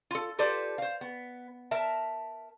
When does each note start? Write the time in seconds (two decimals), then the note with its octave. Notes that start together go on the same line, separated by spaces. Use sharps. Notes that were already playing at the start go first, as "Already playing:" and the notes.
0.11 F4 A4
0.39 F4 G4 A4 B4 C5 D5
0.78 C5 F5
1.01 B3
1.71 A#4 E5 A5